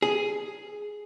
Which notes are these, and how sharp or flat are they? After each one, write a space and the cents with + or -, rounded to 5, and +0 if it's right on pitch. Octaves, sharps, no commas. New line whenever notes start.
G#4 +5